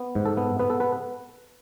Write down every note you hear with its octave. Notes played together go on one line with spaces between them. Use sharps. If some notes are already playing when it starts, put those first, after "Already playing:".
Already playing: B3
G#2
A4
B3
B3 B4
A4
B4